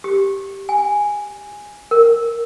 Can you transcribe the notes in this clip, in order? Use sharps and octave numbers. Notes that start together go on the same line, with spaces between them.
G4
G#5
A#4